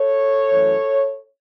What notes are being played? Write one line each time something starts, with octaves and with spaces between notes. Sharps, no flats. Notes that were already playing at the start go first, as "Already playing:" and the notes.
Already playing: A4 C#5
F#2 E3 A3